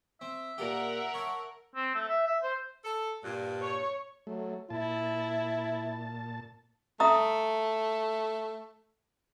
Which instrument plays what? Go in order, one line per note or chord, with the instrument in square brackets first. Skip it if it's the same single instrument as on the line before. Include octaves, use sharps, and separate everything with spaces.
[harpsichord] C4 [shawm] E5
[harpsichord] A#2 G4 [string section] A#4 F#5
[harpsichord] C#5 A5
[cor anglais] C4
A3
E5
E5
C5
[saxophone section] A4
G2 A#2
[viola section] C#5
[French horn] F#3 [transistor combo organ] A3
[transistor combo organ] A#2 A5 [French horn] E4
[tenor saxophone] A3 [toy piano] E5 A#5 D#6